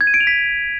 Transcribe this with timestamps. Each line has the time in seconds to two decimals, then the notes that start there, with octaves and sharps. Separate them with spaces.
0.01 G#6
0.07 D#7
0.14 D7
0.20 F7
0.27 B6